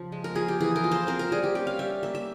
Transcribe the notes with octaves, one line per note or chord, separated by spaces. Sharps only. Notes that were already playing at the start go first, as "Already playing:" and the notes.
Already playing: C#3 F3
G#3
A#4
F3 G#4
G4
E3 G#4
A#4
F4
C5
C4 A#4
A#4
G3 G#4
G4
C#4 G4
F5
G3 E5
A#3 E5
E5